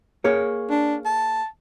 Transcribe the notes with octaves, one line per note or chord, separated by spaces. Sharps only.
A#3 G#4 C#5
D4
A5